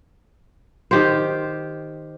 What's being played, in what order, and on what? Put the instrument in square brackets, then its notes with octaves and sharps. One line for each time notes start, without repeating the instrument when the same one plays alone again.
[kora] D#3 G4 C5